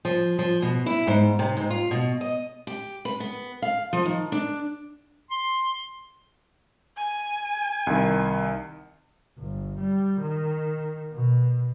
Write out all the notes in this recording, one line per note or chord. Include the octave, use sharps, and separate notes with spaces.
F3
F3
B2
E4
G#2
C3
G#2
F4
B2
D#5
G4
B4
B3
F5
F3
D#3
D4
C6
G#5
C2 D#3
G1
G3
D#3
B2